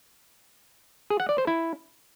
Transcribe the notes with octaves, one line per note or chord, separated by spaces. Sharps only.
G#4
F#5
D5
C5
E4